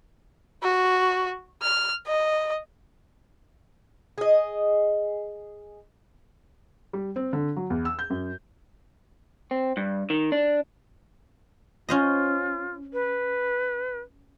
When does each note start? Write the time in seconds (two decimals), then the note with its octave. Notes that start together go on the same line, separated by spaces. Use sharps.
0.63 F#4
1.62 F6
2.07 D#5
4.18 G#4 D#5
6.93 G3
7.16 C4
7.33 D3
7.56 F#3
7.70 E2
7.85 E6
7.99 G6
8.10 F#2
9.51 C4
9.77 G2
10.10 D#3
10.32 D4
11.89 C#4 F4 C5 D#5
12.93 B4